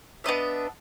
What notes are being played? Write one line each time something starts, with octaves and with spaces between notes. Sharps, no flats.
B3 D4 D#5 E5